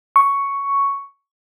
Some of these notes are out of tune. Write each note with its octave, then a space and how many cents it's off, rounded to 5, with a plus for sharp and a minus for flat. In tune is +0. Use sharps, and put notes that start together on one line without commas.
C#6 +5